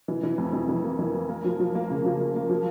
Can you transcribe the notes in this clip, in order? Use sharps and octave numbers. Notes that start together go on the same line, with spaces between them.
E3
E3
F2
E3
E3
A#3
E3
A#3
A#3
F3
F3
A#3
C#3
F3
A#3
A#3
F3